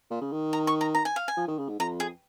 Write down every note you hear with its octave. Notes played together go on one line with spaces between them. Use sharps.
A#2
C#3
D#3
A#5
C#6
A#5
A#5
G#5
F5
G#5
F3
D#3
C#3
G#2
F2 A#5
G#4